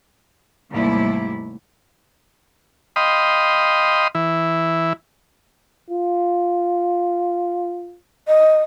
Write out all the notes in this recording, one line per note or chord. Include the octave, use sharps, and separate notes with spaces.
D#2 G#2 C3 G3 A3 E4
D#5 F5 G5 B5 C6 D#6
E3 E4
F4
D#5